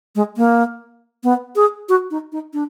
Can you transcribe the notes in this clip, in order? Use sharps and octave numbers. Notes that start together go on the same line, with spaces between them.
G#3
A#3
B3
G#4
F#4
D#4
D#4
D4